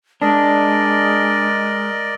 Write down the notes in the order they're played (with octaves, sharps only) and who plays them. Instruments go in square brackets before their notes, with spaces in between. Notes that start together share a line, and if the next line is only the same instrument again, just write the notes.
[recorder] G#3 [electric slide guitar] D4 [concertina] A#4 D5 D#5